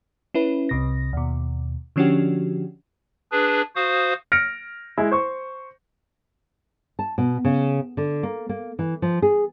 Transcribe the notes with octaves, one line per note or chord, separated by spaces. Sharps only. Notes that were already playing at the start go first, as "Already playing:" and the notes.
C#4 E4 B4
C2 C3 A#6
D#2 B2
D3 F3 C#4 D4 F#4 G4
D4 G#4 B4
F#4 C5 F5 D#6
F6 A#6 C#7 D7
G#3 E4
C5 C#6
A5
B2
C#3
D3
A#3
A#3
E3
F3
G#4